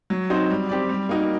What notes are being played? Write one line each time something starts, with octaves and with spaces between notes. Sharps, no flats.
F#3
C4 D#4 F#4 C5
G3
C4 G4 D5
G3
A#3 D#4 F#4 A#4